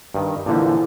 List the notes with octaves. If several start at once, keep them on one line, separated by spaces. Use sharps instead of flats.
G2 D#3
A#2 D3 E3 F3 A5